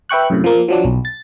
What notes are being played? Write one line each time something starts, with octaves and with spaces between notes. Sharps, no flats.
B4 E5 G5 C#6 F#6
F#2 A2 C3
F3 A#3
F3 F#3 D4
B1
A6